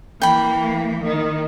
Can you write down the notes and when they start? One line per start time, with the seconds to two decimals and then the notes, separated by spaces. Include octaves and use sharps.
0.22 E3 A#3 G5 B5
1.03 D#3